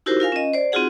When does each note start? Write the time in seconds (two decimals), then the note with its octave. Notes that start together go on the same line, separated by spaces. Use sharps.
0.06 D#4 E4 F#4 G4 A#4 C5
0.20 F4 A#4 F5 G#5
0.32 C#4 D#5
0.53 C5 D5
0.72 C4 D#4 F4 F#4 G#4 F#5